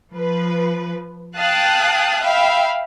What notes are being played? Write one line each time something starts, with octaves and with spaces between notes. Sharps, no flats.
F3 B4
F5 G5 A5 D#6 F#6
E5 F5 G5 B5